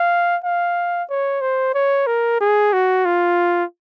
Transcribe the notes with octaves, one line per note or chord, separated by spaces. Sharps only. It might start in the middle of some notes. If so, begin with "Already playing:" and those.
Already playing: F5
F5
C#5
C5
C#5
A#4
G#4
F#4
F4